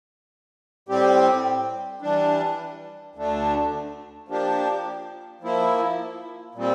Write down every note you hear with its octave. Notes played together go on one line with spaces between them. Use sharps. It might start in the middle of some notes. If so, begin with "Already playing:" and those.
A2 G3 C4 G4
E3 G3 D4
D2 D3 A3 D4
F3 A#3 D4 G4
F3 A#3 E4
A#2 G3 C4